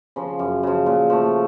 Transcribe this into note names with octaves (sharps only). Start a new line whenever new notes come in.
C#3 F3
F#2
C#3 F3
A#2
F3 A3